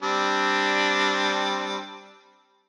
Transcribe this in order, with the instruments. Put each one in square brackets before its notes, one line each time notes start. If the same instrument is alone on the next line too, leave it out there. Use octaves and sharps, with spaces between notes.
[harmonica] G3 C4 D4